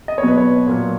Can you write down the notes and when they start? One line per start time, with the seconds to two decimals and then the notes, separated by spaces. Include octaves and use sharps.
0.08 D#5
0.18 C#5
0.23 B2 F#3 B4
0.38 C#5
0.67 A#2 F#3